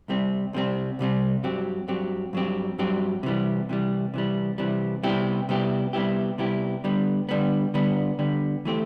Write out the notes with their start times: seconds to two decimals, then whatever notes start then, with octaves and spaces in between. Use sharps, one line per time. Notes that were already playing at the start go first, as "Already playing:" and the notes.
0.08 C2 C3 G3 C4
0.53 C2 C3 G3 C4
0.99 C2 C3 G3 C4
1.43 G2 F#3 C4 G4
1.88 G2 F#3 C4 G4
2.33 G2 F#3 C4 G4
2.78 G2 F#3 C4 G4
3.23 C3 E3 G3
3.69 C3 E3 G3
4.14 C3 E3 G3
4.58 C3 E3 G3
5.03 C3 G3 B3 E4 G4
5.49 C3 G3 B3 E4 G4
5.93 C3 G3 B3 E4 G4
6.38 C3 G3 B3 E4 G4
6.84 D3 G3 B3
7.29 D3 G3 B3
7.74 D3 G3 B3
8.19 D3 G3 B3
8.65 E3 A3 C4 G4